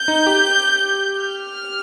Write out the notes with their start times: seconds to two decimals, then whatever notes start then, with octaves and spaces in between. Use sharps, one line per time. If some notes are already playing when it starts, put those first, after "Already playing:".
Already playing: G6
0.08 D#4
0.26 G4
1.22 F6